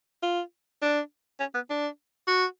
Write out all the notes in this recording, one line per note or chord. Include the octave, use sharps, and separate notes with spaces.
F4
D4
C#4
B3
D4
F#4